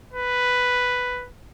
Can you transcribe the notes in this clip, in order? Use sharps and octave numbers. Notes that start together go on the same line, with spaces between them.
B4